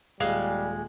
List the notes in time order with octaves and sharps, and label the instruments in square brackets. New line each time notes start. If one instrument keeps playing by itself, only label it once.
[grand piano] D#1 F#6 [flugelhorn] G3 [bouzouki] G#3 [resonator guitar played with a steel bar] F5